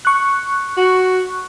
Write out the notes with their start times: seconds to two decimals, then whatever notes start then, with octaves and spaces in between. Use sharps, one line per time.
0.05 C#6 F#6
0.77 F#4